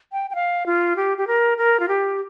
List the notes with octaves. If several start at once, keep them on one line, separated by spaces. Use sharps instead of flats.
G5
G5
F5
F4
G4
G4
A#4
A#4
F4
G4